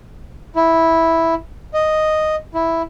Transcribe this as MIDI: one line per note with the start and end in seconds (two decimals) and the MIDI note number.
0.56 1.34 64
1.74 2.35 75
2.54 2.82 64